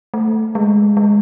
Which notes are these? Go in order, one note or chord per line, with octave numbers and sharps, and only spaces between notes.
A3
G#3
G#3